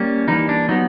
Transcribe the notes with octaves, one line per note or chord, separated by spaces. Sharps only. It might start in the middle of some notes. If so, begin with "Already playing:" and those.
Already playing: G3 A#3 C#4
E3 G3 A#3 D#4
D4
F#3 B3 D#4